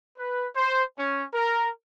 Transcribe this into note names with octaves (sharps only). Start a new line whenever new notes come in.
B4
C5
C#4
A#4